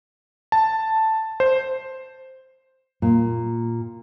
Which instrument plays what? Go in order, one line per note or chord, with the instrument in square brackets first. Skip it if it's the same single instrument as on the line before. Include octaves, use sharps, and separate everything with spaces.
[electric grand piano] A5
C5
[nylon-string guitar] A#2